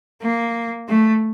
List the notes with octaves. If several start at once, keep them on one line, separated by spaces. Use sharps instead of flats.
A#3
A3